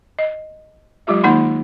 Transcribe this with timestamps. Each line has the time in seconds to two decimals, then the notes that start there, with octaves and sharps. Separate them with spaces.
0.19 D#5
1.07 F#3 G#3 F4 G4 E5
1.23 D#3 A#3 D#4 F#5 B5 C6